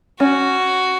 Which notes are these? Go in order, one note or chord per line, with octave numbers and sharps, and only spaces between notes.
C#4 F#4